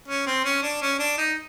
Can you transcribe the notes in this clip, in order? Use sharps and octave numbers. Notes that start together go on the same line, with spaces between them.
C#4
C4
C#4
D4
C#4
D4
D#4